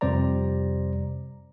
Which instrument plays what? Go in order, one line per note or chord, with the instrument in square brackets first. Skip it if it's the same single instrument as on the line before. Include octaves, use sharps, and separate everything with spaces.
[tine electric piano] F2 C3 G3 C5 D5 A#5